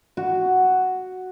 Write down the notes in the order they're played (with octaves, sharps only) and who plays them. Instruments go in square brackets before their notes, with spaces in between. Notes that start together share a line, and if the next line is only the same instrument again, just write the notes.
[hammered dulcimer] F#4